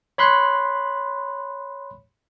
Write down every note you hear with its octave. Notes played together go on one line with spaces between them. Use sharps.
C#5 B5 C6 F#6